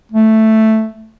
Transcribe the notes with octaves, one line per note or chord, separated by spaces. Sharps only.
A3